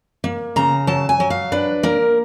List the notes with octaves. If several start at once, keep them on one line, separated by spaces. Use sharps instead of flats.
A#3
C#3 A#5
F#3 A5
G#5
F#3
F5
D4 B4
A#3 A#4